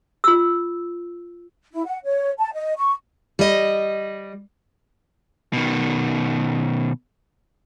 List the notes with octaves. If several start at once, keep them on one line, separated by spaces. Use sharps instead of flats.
F4 E6
E4
F#5
C#5
A5
D#5
C#6
G3 D#5
B2 D#3